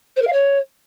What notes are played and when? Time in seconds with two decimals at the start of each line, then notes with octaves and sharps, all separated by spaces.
0.16 C5
0.21 A#4
0.27 F5
0.32 C#5